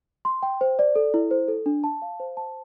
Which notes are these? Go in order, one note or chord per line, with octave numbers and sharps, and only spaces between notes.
C6
G5
C5
D5
A4
E4
C5
A4
D4
A5
F5
C5
A5